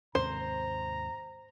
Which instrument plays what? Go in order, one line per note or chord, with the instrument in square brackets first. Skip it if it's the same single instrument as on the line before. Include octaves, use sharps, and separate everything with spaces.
[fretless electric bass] D#2 G#2 C3 [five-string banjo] C5 [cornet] A#5